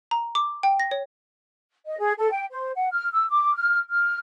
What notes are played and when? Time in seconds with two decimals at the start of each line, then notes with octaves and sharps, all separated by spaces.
0.11 A#5
0.35 D6
0.63 G5
0.80 A#6
0.91 C#5
1.85 D#5
1.99 G#4
2.18 A4
2.31 G5
2.51 C5
2.75 F#5
2.92 F6
3.12 E6
3.29 D6
3.55 F6
3.89 F6